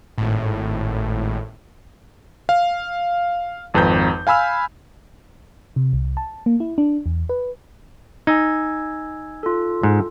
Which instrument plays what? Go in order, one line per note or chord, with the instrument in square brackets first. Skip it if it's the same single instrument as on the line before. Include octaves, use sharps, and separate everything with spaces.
[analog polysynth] G#1 A2
[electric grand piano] F5
G#1 F2 B4 A#5 G6
F5 G#5 B5 E6 F6
[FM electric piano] C3
C2
A5
A#3
E4
D4
E2
B4
[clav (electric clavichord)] D#4 [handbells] G#5 E6 G#6
[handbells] F4 A4
[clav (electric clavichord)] G#2